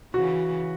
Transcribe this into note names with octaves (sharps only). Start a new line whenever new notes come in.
C#3 E3 F#4